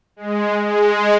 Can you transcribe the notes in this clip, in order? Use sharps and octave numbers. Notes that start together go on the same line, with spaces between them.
G#3
G#3